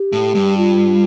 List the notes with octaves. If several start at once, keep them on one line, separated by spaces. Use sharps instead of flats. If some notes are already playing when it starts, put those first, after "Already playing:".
Already playing: G4
A2
G2
F4